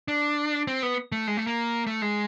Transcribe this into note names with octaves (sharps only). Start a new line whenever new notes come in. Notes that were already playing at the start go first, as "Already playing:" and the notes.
D4
C4
B3
A3
G#3
A3
A#3
A3
G#3